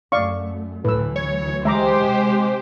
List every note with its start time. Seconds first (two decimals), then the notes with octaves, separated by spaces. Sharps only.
0.12 F#2 A3 D5 F5 C#6
0.85 D2 A2 E3 F#3 B4 E6
1.16 C#5
1.65 G#3 G4 C5 E5 A#5 D6
1.99 C3